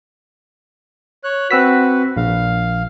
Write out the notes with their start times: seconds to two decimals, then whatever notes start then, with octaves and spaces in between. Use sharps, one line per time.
1.24 C#5 F#6
1.51 C4 F#4 B4 E6 B6
2.17 A#1 F5